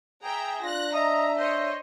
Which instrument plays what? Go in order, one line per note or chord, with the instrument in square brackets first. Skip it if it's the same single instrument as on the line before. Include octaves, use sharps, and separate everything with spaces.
[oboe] G#4 [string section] E5 G5 A#5
[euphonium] D4 [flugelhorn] F4 [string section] F#6 A#6
[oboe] D#5 [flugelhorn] E5 [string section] A#5
[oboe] C5 [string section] C#5 D#5